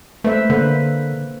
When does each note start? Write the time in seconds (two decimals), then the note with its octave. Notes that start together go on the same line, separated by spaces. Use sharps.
0.24 A3 B4 C5 E5
0.50 D3 A#3 B4 C5